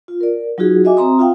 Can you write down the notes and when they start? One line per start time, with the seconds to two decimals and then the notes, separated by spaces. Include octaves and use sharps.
0.08 F4
0.21 A#4 D5
0.58 F#3 D#4 F4 F#4 G#4
0.84 F#4 D#5 E5 G#5 D6
0.97 C4 C5 A#5 C6 D#6
1.19 F4 E5 F5 G5